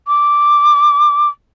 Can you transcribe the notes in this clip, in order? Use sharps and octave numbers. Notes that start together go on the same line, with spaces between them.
D6